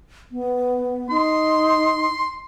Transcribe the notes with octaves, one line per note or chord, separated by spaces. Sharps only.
B3
D#4 C6